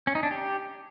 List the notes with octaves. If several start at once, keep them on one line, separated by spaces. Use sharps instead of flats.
C#4
D#4
D4
G4